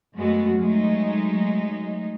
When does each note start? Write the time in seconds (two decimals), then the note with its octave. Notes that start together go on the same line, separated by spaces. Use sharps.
0.15 F#2 G#3 A3 B3 F#4
0.56 F#3 G#3 A3 D#4